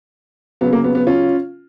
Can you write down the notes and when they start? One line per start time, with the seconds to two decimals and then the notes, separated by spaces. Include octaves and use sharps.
0.61 C#3 F#3 B3
0.73 A#3
0.84 B3
0.95 B3
1.07 C#4 F4